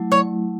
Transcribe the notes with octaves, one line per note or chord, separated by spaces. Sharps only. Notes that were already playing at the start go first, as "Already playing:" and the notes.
Already playing: F#3 A3 E4
C#5